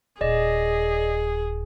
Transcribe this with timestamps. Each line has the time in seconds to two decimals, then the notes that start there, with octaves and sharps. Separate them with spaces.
0.21 D#1 G#4 D5 D#5